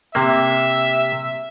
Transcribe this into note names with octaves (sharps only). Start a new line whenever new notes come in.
C3 A#3 E5